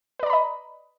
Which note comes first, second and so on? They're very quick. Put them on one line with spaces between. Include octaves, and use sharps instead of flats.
B4 D5 A#5 B5 D#5